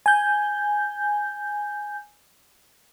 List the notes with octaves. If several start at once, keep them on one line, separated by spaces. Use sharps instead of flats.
G#5 G6